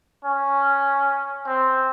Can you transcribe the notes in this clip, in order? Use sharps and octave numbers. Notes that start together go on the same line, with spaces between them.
C#4
C4